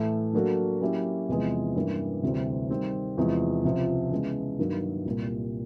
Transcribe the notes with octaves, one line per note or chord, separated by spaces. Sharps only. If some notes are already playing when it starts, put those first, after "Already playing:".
Already playing: A2 E3 A3
F#3 A#3 D4 F#4 A4
F#3 A#3 C#4 E4 G4
E2 C3 F3 G#3 B3
G2 E3 G3 A#3 C#4
D2 C3 E3 G3 C4
D#3 G3 C4
E2 C3 F3 G#3
C#2 C3 F3
C#3 E3 G#3 B3
G2 D#3 F#3 A#3
C2 A#2 G3